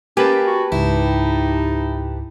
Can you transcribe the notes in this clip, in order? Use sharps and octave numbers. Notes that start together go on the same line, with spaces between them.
A#3 C#4 G4 B4 G#5 A5
F#4
C#2 G#2 D#4 E4